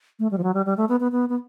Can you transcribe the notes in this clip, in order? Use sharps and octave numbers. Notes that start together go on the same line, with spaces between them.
A3
G3
F3
F#3
G3
G3
A3
B3
B3
B3
B3